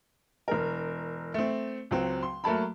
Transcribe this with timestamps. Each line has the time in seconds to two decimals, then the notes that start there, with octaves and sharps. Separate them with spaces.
0.48 E1 A#4
1.34 A3 C4
1.91 C#2 F#3 C4
2.23 C6
2.44 F#3 A3 A#3 A5 B5